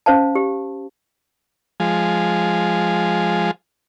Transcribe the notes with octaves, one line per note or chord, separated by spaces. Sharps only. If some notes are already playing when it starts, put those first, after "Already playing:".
C#4 C5 F5 A5
G4
F3 G#3